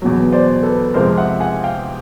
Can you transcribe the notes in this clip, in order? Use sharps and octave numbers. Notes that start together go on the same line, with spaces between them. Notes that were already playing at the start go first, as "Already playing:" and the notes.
E2 B2 F#3
C5 D5
A4 B4
F2 C3 F3 G#3 A#4 C5
E5 F#5
F#5 G#5
F5 G5